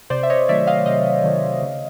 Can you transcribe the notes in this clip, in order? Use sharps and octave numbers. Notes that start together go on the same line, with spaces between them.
C3 C5 D5
E5
C#5 D#5
D#3 F#3 A3 D5 E5
D#5 F5
C3 D#5 F5
D#3 F#3 A3
C#3